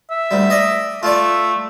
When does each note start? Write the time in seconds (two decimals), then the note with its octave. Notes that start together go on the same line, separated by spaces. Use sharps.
0.10 E5
0.31 D2 G3
0.50 D5 D#5
1.03 A3 F4 D5